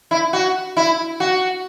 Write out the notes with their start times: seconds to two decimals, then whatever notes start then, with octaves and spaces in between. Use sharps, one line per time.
0.11 E4
0.33 F#4
0.77 E4
1.20 F#4